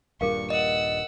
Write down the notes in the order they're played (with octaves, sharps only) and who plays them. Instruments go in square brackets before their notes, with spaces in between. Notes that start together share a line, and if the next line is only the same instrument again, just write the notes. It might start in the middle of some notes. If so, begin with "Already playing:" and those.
[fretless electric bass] D#1 G2 A#2 [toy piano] G#4 A#4 F5 [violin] C#6
[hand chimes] D#5 [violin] F#5 E6